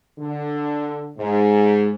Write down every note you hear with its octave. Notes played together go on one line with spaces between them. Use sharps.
D3
G#2